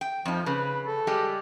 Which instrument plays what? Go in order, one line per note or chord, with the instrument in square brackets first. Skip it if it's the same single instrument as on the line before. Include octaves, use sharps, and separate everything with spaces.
[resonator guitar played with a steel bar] G5
[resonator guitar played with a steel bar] F2 D#4 [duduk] F3
[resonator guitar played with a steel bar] C#3 [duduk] B4
[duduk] A4
[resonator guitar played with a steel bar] G3 G#3 G4